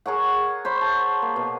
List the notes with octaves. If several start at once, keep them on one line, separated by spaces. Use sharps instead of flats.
G#4 A#4 C#5 F#5
C5 C#5 B5
A5
A#3
B2